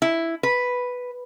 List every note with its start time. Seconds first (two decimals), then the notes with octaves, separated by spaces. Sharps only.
0.02 E4
0.43 B4